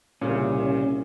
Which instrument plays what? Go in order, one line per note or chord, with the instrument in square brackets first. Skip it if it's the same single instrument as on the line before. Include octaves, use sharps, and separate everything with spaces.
[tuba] C2 [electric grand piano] A#2 C#3 [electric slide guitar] C#4